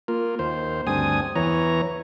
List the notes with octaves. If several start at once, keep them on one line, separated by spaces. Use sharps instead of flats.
A#3 F4
D#2 C5
D2 G2 C4 G#5 D#6
E2 E3 C#5 A#5